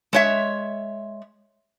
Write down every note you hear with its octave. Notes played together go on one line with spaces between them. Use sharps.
G#3 C#5 E5